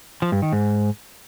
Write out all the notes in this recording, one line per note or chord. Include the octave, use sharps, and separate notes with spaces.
F3
G2
D#3
G#2